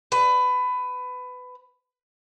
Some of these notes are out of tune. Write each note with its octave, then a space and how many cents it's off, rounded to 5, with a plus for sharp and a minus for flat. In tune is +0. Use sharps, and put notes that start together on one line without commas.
B4 +20